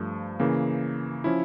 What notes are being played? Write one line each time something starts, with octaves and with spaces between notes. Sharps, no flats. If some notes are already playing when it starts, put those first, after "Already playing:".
Already playing: G2 F3 A3
C#3 E3 A#3
F3 C#4 E4